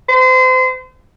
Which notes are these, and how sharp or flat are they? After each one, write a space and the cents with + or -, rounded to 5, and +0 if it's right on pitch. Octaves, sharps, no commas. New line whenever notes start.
C5 -30